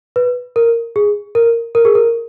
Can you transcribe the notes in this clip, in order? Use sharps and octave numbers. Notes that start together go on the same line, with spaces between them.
B4
A#4
G#4
A#4
A#4
G#4
A#4